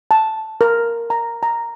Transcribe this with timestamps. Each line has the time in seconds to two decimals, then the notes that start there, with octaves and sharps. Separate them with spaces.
0.11 A5
0.61 A#4
1.10 A#5
1.43 A#5